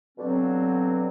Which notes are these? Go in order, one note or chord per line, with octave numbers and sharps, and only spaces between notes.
G2 B2 D3 F#3 C4